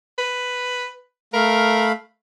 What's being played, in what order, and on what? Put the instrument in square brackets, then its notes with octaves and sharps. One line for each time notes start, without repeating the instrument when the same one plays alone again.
[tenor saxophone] B4
[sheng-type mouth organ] A3 F5 B5 [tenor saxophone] A#4